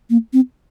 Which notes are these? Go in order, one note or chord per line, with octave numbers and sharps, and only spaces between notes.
A#3
C4